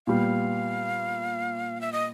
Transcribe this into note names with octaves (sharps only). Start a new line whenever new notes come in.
A#2 G3 B3 F5
E5
D#5